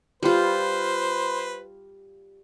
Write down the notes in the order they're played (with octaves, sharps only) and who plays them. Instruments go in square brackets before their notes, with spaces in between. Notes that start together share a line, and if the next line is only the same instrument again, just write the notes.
[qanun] G3 F4 [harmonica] B4 C5